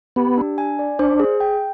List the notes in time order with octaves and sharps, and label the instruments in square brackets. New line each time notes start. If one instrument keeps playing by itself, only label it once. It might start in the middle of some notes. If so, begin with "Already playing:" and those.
[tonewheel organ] B3 [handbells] G4
[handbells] D4
G#5
D5
[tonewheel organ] D4 [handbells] C5
[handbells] G#4
G5